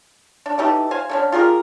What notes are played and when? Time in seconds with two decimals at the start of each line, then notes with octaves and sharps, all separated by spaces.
0.46 D4
0.58 E3 D#4 G4 A4
0.91 C5 F5 G#5
1.09 D3 A#3 C#4
1.32 F4 G4 G#4 A#4